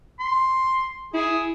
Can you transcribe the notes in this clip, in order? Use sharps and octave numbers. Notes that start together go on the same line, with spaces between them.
C6
E4 G#4